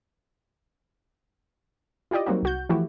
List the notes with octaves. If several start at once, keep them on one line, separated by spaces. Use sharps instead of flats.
E4 F4 G4 D5 D#5
F#3 G3 A#3 C4 D#4 F#4
C2 F#4 G6
E3 F3 A3 E4 F#4 G4